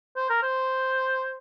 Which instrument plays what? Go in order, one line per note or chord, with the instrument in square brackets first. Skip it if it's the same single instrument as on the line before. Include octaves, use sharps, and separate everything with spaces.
[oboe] C5
A#4
C5